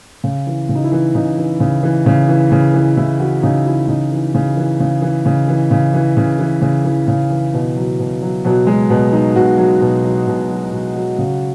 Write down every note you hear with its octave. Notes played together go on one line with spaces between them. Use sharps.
C#3
E3
C#3
D#4
E4
E3
C#3 D#4
E3
C#3
E3
C#3
E3
C#3
E3
C#3 E4
E3 F#4
C#3 D#4
E3 E4
C#3 D#4
E3
C#3
E3
C#3
E3
C#3
E3
C#3
E3
C#3
E3
C#3
E3
C#3
E3
B2
F#3
B2
F#3
B2 F#3
F#3 G#3
B2
F#3 D#4
B2 F#4
F#3
B2
F#3
B2
F#3
B2
F#3
C#3